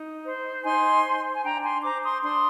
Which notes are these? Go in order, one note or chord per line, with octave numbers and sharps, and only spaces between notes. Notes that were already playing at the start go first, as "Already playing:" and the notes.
Already playing: D#4
C5
D#4 G#5 C6
C5
G#5
D4 G5 A#5
G#5 C6
C5 A#5 D6
C6 D#6
D4 C6 D#6